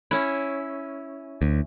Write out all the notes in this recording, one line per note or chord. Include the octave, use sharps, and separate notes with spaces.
C#4 E4
D2